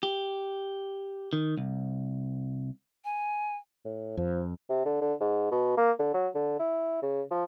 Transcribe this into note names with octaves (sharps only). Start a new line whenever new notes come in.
G4
D#3
C2
G#5
A2
F2 F3
C3
D3
D3
G#2
B2
A#3
D3
F#3
D3
E4
C#3
F3